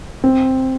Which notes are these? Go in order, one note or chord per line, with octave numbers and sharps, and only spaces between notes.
C4